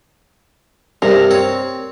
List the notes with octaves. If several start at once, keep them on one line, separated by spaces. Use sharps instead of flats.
G2 C3 A#4
C4 C#5